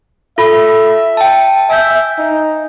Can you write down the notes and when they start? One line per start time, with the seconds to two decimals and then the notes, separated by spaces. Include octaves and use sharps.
0.38 F4 A4 E5 B5
1.17 G5 A5
1.70 E5 G#5 G6
2.18 D#4